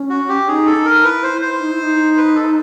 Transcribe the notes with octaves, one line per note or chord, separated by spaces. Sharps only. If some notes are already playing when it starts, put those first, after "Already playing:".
Already playing: C#4
F#4
G4
D#4 G#4
A4
D#4
A#4
E4 B4
C5
E4
C5
D#4
E4
D#4
B4
A4